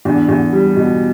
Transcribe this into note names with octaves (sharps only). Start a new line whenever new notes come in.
E2 D4
E2
G3
B2